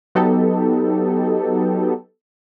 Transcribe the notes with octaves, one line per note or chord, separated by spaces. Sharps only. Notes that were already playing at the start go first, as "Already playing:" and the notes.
F#3 B3 D#4 G4 A4